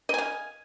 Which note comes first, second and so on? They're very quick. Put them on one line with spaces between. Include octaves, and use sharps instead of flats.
D#5 G#5 F5